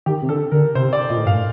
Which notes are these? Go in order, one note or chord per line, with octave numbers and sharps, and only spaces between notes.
D#3 G4
C3
D3 A4
D3 A#4
C3 C5
D5
A#2 D#5
A2
G2 F5
A2